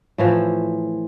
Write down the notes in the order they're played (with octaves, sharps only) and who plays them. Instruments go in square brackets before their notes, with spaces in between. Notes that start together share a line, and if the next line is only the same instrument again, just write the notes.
[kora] A2 E3 F3